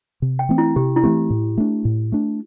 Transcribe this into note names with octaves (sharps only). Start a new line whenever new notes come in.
C3
G5
E3 A3 C4
E4
C3 G4
E4
E3 A3 C4 G4
A2
A3 D4
A2
A3 D4